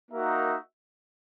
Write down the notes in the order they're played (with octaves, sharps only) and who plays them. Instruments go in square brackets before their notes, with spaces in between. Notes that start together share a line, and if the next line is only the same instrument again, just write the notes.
[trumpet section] A#3 D#4 F#4 A#4 E5